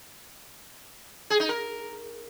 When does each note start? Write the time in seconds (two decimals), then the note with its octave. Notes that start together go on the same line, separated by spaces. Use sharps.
1.30 G#4
1.40 D#4
1.49 A#4